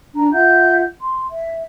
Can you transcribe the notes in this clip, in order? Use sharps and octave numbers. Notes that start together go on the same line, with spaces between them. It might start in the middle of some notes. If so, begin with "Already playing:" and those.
D4 A#5
F4 E5 F#5 G6
C6
E5